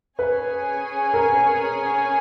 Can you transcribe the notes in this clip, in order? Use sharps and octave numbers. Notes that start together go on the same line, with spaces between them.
C#4 G#4 B4 C#5 G#5
A#4